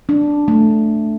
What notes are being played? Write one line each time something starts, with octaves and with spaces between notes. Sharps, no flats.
D4
A3